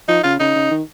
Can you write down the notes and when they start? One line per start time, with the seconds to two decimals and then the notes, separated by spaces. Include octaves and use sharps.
0.08 F3 D#4
0.24 C#3 F4
0.40 C#3 D#4
0.56 C#3
0.71 D#3